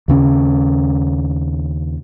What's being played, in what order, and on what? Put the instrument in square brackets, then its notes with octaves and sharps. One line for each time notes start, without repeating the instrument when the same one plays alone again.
[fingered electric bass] D#2 C#3 C#4